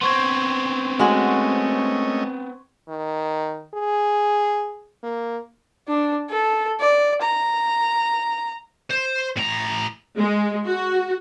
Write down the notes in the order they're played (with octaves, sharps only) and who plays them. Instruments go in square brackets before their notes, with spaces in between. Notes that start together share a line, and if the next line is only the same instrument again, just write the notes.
[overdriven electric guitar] B3 C4 [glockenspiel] C6 C#6 G#6
[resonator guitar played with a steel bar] G#3 F#4 [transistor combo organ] A3 C#4 D#5
[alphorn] D#3
G#4
A#3
[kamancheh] D4
A4
D5
A#5
[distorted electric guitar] C5
A2 A#5
[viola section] G#3
F#4